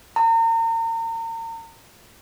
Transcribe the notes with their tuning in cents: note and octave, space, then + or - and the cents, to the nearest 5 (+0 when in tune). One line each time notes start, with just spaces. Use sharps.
A#5 -35